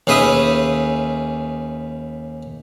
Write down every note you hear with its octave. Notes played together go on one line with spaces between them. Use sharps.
D#2 C#4 G#4 B4 E5 D#6